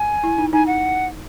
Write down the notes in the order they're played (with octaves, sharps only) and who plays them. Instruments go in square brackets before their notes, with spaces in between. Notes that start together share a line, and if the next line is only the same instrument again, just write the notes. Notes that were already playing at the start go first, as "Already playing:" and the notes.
Already playing: [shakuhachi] G#5
[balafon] E4
D#4
[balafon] D#4 [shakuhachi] G#5
[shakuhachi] F#5